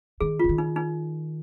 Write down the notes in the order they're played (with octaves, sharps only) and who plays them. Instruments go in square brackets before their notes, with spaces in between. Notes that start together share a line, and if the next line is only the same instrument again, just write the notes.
[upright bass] D#3 [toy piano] G#4
[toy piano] F4
[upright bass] D3
D#3
[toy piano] D#4
D#4